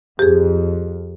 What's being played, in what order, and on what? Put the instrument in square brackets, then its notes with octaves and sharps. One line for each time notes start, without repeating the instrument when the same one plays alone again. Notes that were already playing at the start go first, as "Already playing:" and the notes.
[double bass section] F2 [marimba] G4 G#4